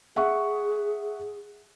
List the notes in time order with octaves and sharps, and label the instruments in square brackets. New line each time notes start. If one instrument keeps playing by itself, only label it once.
[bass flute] G#4 [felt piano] E5 F#5 C#6